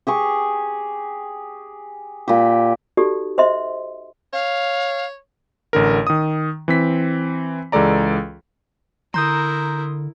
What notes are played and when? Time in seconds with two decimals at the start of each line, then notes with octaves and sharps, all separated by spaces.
0.07 G4 G#4 C#6
2.28 A#2 G4
2.97 D#4 F#4 G4 A4 D5
3.38 C5 D#5 E5 C6
4.33 C#5 F5
5.73 A1 D3 A#4
6.07 D#3 D#6
6.68 E3 C4 B6
7.72 C#2 E3 G#3 A4 D5 A#5
9.14 D3 E4 A#4 A#5 C6 D#6 G6